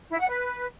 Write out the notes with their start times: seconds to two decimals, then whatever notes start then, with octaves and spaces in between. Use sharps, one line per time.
0.10 E4
0.19 F#5
0.28 B4